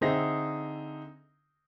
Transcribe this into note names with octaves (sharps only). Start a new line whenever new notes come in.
D3 C4 D#4 G#4 E5 A#6